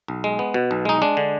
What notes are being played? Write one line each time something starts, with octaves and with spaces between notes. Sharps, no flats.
B1
G#3
B3
B2
B1
G#3 D#4
G#3 D4
D3